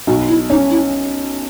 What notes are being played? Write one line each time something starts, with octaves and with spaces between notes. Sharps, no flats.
B1 F#4
E4
C#4 D#4
E4